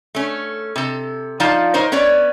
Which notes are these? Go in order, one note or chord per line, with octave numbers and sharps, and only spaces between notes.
A3 C#4
C3 A4
F3 D#4 F4 D5 F5 A5
D#4 A#4 C5 C#5
B3 C#4 C#5 D5